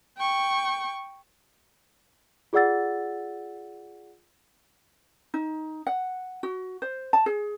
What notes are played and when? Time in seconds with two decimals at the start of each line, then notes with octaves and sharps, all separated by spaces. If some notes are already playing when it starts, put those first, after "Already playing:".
0.17 G5 C#6
2.53 F4 G#4 D5 F#5 E6 A6
5.34 D#4
5.87 F#5
6.43 F#4
6.82 C5
7.13 A5
7.26 G#4